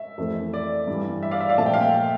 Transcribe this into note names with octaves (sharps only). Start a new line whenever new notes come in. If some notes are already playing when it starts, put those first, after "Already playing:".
Already playing: E5
F2 E3 A3
D5
G2 E3 G3
E5
D5 F5
E5
D5 F5
A#2 F3 A3 A5
G5
F5
E5 G5